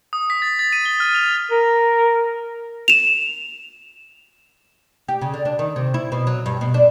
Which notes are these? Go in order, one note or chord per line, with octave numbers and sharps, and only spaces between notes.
D#6
B6
A6
A6
D#7
G7
F6
F7
A#4
E7 F7
G4
C#3
D3
D4
D#3
C3
E4
B2
F#3
G2
B2
D4